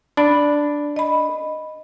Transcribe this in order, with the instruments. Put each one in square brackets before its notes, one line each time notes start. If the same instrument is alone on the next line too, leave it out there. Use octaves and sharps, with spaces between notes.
[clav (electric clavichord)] D4 [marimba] B5
[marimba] D#5 B5